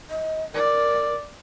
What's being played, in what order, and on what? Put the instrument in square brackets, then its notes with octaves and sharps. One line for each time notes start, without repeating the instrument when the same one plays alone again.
[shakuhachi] D#5
[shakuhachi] A#4 [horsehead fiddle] D5